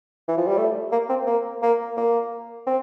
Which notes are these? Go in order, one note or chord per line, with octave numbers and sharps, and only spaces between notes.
E3
F3
G3
A3
A#3
C4
A#3
A#3
A#3
C4